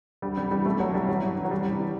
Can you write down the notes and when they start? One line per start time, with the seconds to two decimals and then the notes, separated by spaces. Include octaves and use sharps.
0.22 D2 G3
0.37 C3 G3
0.51 E3 G3
0.66 B2 A3
0.80 C2 F#3
0.94 C2 G3
1.08 E3 F#3
1.22 G2
1.37 E3
1.45 F#3
1.51 C2 G3
1.66 C3
1.80 E3